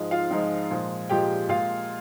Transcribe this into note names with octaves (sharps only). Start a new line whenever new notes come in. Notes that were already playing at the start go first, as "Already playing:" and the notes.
Already playing: G#2 F3 G#3
F4 F5
G#2 F3 G#3
A#2 F3 G#3
A#2 F3 G#3 G4 G5
A#2 G#3 F4 F5